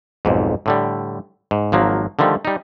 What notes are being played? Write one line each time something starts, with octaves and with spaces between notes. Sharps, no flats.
B1 F2 G#2
A2 D3 G3
G#2
G#1 F3 F#3 A#3
D3 D#3 F3 G3 A3
G3 D#4